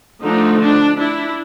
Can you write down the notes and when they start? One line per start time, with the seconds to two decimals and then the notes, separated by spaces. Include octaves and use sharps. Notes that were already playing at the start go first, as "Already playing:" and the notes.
0.21 D3 F3 A3 D4 D#4
0.59 D4
0.97 D4 E4